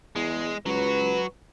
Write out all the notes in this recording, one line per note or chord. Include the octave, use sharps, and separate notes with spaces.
E2 G#3
C#2 F#3 F#4 B4